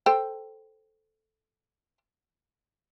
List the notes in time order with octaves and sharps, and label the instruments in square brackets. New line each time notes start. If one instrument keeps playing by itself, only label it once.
[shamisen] A4 C5 G5